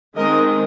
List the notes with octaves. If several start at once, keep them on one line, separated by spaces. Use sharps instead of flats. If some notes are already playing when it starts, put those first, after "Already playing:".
D#3 G#3 C4 A#4 D#5